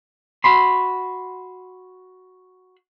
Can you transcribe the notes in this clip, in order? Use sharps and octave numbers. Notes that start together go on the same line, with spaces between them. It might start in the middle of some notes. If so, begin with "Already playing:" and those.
F#4 B5 C6